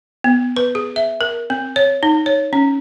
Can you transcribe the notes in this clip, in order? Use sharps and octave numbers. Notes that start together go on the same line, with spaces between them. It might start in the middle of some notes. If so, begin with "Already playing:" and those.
B3
B4
G#4
E5
A#4
C4
C#5
D#4
C#5
C#4